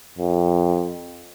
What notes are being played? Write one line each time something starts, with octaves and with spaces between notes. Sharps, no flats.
F2